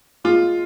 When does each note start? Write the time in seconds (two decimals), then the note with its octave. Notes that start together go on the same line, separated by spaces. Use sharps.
0.24 G#3 F4